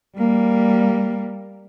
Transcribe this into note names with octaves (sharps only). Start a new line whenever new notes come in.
G3 A#3